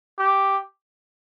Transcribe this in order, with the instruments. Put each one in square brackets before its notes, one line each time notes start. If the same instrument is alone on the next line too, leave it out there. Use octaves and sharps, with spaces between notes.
[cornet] G4